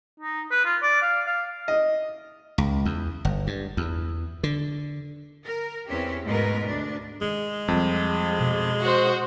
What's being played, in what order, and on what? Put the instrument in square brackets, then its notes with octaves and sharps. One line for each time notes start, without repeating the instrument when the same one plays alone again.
[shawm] D#4
B4
F4
D5
F5
F5
[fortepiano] D#5
[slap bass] C#2
E2
G1
G2
E2
D3
[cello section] A#4
E2 C4 C#4 G4 E5
G#2 B2 G#3 A3 A#4 B4
D2 D4
[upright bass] D#3 [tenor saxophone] G#3
[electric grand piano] F2 [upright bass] G3 C4
[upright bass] B2
[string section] F#4 C5